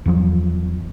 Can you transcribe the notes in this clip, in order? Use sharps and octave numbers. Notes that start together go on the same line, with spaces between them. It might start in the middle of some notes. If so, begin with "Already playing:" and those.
E2 F3 F#3